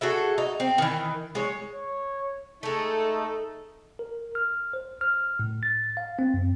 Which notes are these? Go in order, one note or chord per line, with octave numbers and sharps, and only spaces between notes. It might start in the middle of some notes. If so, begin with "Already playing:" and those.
F#4 G#4 A4 E5
D#4
C4
D#3 E3
G#3 C#5
C#5
G#3 A3 D#4 A4
A#4
F6
C5
F6
A2
A6
F5
C4
F#2